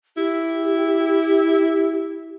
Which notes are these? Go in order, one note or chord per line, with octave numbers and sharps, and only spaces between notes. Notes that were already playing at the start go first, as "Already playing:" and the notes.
E4 G4